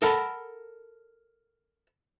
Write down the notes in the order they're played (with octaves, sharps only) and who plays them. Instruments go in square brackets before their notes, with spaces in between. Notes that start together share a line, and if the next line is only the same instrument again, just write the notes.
[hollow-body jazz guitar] A4 A#4 F#5 A5 B5